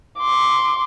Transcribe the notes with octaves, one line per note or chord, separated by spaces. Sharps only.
C6 D6